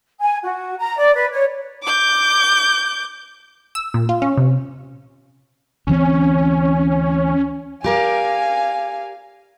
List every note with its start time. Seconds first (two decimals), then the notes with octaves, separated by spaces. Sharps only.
0.20 G#5
0.43 F#4
0.79 A#5
0.97 D5
1.14 B4
1.32 C#5
1.83 D6 G6
3.75 E6
3.94 A#2
4.09 F4
4.22 C#4
4.37 C3
5.87 D2 E3 C4 C#4
7.84 G4 A#4 D5 F5 G#5